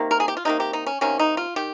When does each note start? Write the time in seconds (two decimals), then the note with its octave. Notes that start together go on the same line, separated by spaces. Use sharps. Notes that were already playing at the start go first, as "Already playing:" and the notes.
Already playing: C3 D#3 A#3
0.11 A#4
0.20 G#4
0.28 G4
0.37 F4
0.45 C3 D#3 A#3 D#4
0.60 G4
0.73 D#4
0.87 C#4
1.01 C3 D#3 A#3 C#4
1.19 D#4
1.37 F4
1.56 D#3 G4